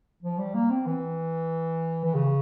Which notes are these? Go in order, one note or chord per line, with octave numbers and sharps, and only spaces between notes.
F3
G3
A#3
C4
E3
E3
C#3